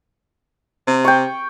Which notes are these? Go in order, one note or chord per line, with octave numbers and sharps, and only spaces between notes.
C3
G5 C#6